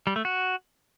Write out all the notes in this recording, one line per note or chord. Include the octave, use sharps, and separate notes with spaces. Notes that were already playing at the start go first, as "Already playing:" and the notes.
G3
A3
F#4